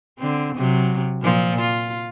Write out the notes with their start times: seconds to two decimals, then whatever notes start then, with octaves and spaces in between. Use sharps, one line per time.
0.18 D3 C4
0.55 C3 F#3
1.22 A#2 F3
1.61 F4